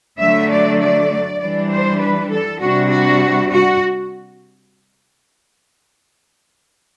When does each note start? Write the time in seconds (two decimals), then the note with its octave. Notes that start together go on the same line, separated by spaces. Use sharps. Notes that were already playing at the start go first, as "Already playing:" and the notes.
0.19 D3 F#3 A3 E5
0.50 D5
0.81 D5
1.40 E3 G3 D4 D5
1.71 C5
2.01 B4
2.31 A4
2.61 C3 G3 D4 F#4
2.90 F#4
3.51 F#4